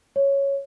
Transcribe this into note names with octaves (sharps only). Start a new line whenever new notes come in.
C#5